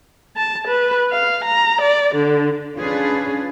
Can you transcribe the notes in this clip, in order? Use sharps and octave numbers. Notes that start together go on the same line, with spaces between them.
A5
B4
F5
A#5
D5
D3
C#4 D4 F4 G#4 B4